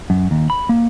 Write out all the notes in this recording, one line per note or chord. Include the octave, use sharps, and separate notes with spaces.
F#2
D#2
B5
A#3